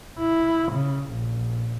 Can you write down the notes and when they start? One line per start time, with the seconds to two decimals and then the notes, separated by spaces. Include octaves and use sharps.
0.19 E4
0.71 C#3
1.09 A#1